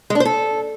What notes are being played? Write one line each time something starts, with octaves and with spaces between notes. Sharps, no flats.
G#3
D4
C5
A4